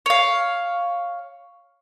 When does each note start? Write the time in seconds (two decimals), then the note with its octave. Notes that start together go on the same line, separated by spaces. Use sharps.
0.06 C#5 F5